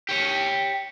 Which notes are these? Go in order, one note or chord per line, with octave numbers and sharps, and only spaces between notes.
G4 C#5